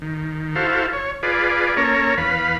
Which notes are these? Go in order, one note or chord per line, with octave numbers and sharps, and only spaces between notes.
D#3
E4 F#4 A4 C5 F5
C#5
F4 G#4 B4 D5
A#3 C#4 A4 C#5 A#5
E2 B4 F5 B5